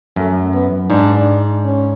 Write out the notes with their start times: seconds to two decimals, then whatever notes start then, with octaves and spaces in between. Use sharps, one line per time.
0.16 F#2 A3
0.54 B3
0.90 G#2 D4
1.65 C#4